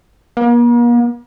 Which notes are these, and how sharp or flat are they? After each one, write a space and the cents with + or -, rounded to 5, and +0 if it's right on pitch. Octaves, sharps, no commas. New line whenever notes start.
A#3 +45